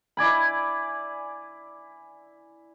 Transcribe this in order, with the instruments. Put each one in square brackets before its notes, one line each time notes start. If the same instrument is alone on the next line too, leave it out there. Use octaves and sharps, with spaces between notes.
[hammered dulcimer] E4 D5 G#5 B5